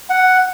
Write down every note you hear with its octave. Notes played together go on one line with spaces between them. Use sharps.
F#5